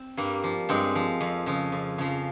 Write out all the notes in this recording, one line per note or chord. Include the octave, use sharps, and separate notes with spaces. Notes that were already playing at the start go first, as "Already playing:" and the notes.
Already playing: C4
G2 G3 A#3
F3
G2 G#3 C4
F3
F2
C#3 F3
F2
C#3 F3